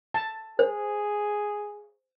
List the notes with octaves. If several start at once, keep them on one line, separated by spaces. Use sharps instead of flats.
A5
G#4 C5